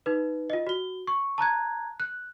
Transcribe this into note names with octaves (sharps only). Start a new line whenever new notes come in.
D#4 B4
F4 D#5
F#4 G7
C#6
A5 A#5 F#6 G#6
F#6